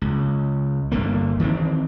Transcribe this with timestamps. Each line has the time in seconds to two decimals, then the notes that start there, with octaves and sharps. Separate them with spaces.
0.01 C#2
0.92 G1 D3 A#3
1.40 D#3 E3 G3 C4